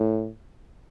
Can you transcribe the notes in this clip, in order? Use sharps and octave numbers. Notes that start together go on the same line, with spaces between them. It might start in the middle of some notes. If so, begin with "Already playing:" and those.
Already playing: A2